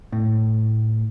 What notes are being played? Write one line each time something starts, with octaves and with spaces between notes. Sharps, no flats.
A2